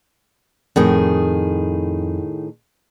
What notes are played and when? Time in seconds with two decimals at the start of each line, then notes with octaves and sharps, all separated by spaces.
0.76 F2 A2 D#3 G#4